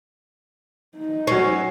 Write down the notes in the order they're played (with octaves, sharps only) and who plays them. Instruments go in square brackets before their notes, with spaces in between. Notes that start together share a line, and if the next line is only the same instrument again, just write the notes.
[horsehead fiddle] D#4
[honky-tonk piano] F#3 C7 [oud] C#4